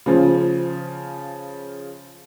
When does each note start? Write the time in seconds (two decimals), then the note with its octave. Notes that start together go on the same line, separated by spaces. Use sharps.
0.06 C#3 F3